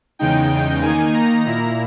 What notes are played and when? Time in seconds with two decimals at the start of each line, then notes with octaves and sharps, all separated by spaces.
0.19 E2 C#3 G#3 D#4 G5
0.82 D#3 A#3 D#4 G#5
1.14 A#5
1.46 A#2 A#3 E4 A#5